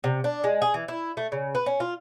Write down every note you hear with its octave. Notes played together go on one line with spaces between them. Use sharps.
C3
D4
G#3
G#4
E3
E4
A3
C#3
B4
C#4
F4